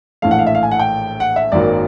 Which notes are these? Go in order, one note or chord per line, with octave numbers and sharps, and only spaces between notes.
A#1 A2 E3 A3 F5
F#5
F5
E5
F5
G#5
F#5
G5
F#5
E5
G#1 F#2 D#3 F#3 A#3 D5